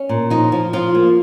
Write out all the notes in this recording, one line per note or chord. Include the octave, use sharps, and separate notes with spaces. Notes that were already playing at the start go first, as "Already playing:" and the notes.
Already playing: C#4
A#2
F3 D#4
F3
F3 F4
A#3